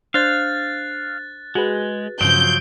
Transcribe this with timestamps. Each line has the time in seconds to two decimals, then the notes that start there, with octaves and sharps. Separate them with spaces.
0.14 D4 C5 F5 F#6 G6 A6
1.55 G#3 F#4 G#4 B4
2.21 G2 C#3 F3 F#3 G6 D7